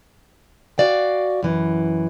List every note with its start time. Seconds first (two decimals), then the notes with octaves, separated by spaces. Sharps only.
0.78 F#4 D5 F5 G5
1.43 F#2 E3